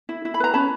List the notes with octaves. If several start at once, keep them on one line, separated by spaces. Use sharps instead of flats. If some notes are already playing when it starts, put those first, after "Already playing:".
E4
E4
B5
B4 A#5
C#4 A5 B5